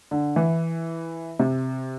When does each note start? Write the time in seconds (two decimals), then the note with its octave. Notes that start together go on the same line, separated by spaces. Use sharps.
0.11 D3
0.36 E3
1.39 C3